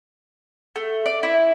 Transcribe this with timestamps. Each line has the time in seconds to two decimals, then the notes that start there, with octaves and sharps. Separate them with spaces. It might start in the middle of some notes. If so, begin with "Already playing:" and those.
0.76 A3
1.06 D5
1.23 E4